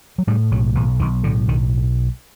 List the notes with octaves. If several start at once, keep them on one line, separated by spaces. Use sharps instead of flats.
F#3
A2 G3
B1 F#3
B1 E3
B1 D#3
A2 D3
B1 D#3